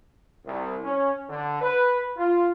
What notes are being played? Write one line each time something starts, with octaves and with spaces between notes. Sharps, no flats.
C2
C#4
D3
B4
F4